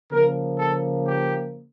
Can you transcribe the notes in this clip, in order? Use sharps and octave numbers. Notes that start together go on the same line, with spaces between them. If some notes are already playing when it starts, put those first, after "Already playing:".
C#3 F3 A#3 A#4
A4
G4